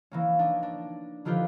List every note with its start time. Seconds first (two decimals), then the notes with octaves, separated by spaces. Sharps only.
0.11 E3 A#3 C#4
0.39 D4 D#4
0.63 D4
1.25 D3 D#3 F3 F4 G4 B4